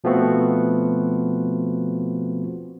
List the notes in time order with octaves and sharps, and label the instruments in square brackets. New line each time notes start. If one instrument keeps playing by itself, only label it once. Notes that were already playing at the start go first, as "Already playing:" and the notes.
[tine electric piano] B2 F3 A3 B3 C4 F#4